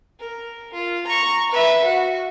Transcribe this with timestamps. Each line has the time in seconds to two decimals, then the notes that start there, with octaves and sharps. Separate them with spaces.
0.19 A#4
0.73 F4
1.07 A#5 C#6
1.51 B4 E5
1.84 F#4